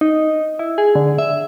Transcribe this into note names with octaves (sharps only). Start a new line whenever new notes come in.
D#4
E4
G#4
D3
E5